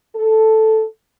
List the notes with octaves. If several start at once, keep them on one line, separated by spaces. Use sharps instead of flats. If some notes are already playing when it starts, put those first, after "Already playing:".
A4